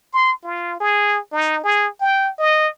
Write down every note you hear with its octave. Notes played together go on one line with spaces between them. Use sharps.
C6
F4
G#4
D#4
G#4
G5
D#5